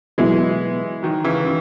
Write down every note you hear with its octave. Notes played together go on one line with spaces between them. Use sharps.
B2 E3 F#3 G#3 B3 E4
D#3 F#3
C#3 E3
D#3